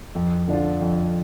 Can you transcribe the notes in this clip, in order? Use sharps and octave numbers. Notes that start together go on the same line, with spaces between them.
F2
D3 F3 D4 F4
F2